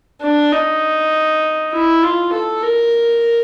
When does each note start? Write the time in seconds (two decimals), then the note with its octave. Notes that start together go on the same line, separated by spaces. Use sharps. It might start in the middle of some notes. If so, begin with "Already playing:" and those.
0.21 D4
0.52 D#4
1.73 E4
2.03 F4
2.33 A4
2.63 A#4